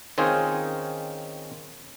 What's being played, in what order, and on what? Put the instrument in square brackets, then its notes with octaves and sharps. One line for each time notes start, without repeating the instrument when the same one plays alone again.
[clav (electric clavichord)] D#3 C4 C#4 D#4 F4 G#4